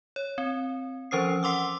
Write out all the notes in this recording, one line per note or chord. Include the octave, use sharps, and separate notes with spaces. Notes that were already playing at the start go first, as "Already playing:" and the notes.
C#5
C4
E3 F3 C#4 C5 D#6 C7
F#5 C6 D6 E6